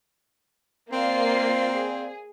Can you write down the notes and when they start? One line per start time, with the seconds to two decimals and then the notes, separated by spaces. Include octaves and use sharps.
0.93 A#3 C4 F4 C5 D5 F5 C7
1.74 G#4